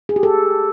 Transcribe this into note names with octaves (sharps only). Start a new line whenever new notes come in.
G#4
G4
A4